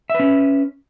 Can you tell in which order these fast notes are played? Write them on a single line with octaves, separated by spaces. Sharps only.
E5 B4 C#4